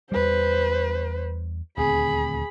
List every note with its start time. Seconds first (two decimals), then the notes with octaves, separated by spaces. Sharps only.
0.12 E2 G3 B4 C5
1.78 D#1 D2 C4 G#4 B5